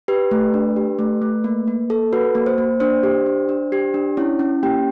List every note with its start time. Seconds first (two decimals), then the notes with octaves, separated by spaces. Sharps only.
0.08 G4 B4
0.31 A3
0.54 D4
0.76 G4
0.99 A3
1.22 A3
1.44 A#3
1.67 A#3
1.90 A4
2.13 F#4 B4
2.35 A#3
2.46 C5
2.58 A#3
2.80 D4 C5
3.03 G4
3.26 D4
3.49 D4
3.72 G4
3.94 D4
4.17 C#4 E4 C#5
4.39 C#4
4.63 A#3 G4 G5